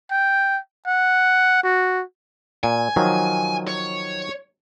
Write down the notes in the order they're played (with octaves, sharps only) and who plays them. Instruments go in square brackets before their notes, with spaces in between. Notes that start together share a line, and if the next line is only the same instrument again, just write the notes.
[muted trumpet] G5
F#5
F#4
[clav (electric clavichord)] A#2 [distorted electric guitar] G#5
[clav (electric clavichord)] D#3 F3 F#3
[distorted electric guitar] C#5